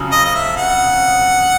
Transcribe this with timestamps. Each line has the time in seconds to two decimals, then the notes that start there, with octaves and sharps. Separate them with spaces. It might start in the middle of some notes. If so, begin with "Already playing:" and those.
Already playing: F2 C#3 F#3
0.12 D#5
0.25 D#5
0.35 E5
0.57 F#5